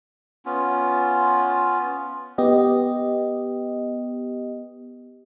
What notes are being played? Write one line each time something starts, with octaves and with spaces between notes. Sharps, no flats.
B3 C#4 F4
B3 G4 D#5